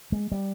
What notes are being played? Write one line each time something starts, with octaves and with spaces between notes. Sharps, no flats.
G#3
G3